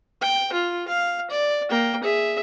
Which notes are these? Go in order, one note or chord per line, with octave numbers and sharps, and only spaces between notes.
G5
F4
F5
D5
A#3 G5
G#4 E5